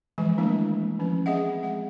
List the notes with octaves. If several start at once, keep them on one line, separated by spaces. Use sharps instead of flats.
E3 F3 G#3 G#5
D#3 A3 A#3 D4 E4
F3 C#4
C4 G#4 D#5 E5 F#5
G#3 F#5